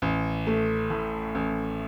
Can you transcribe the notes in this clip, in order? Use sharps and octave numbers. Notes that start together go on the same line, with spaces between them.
A1
A3
A2
A1